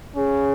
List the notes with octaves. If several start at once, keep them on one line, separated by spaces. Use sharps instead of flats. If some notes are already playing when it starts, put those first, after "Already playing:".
C#4 G#4